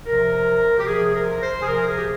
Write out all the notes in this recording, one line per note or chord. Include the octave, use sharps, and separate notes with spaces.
C3 F3 A#4
G4
C3 F3 G#4
G#4
A#4
C5
G#4
C3 F3 A#4
G#4
G4